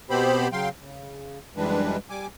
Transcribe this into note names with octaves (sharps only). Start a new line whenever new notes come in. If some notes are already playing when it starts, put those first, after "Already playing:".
B2 B3 C4 G4 C5 B5
C#3 F#3 F5 G5 C6
C#3
F#2 E3 G3 G#3 D4 B4
G3 G#5 D6